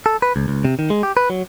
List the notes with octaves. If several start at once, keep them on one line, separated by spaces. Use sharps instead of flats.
A4
B4
C#2
C#2
C3
D#3
G#3
G4
B4
F#3